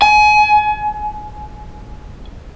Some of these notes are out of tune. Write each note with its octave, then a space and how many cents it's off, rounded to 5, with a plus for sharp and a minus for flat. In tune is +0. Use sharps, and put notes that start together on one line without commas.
G#5 +30